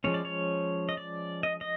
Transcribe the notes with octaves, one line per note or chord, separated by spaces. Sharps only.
F3 G#3 C#4 C#5
D5
C#5
D#5
D5
D#5
D#5